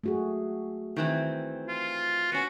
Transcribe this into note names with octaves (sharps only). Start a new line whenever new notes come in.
A3 F#4 G#4
D#3 E3 C4
F4
B3 C#4 F#4